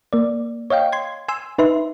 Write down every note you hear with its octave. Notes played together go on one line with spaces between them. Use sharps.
A#3 D5
C#5 D#5 F5 G5
C6 G#6
G#5 C6 E6
D#4 B4 E5 C6